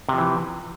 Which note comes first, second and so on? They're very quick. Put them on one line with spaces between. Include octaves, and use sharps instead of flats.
C3 F3 E3